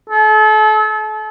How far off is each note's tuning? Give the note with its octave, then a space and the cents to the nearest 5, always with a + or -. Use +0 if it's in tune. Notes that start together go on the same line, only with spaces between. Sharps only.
A4 -35